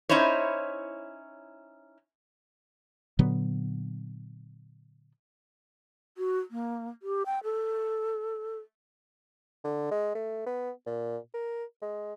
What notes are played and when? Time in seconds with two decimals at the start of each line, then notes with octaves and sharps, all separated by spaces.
0.09 C#4 D#4 E4 C5 C#5
3.19 A#2 D3 F#3 B3
6.18 F#4
6.51 A#3
7.03 G4
7.26 G5
7.44 A4
9.64 D3
9.91 G#3
10.15 A3
10.46 B3
10.87 A#2
11.34 A#4
11.82 G#3